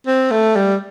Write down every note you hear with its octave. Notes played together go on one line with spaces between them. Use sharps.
C4
A3
G3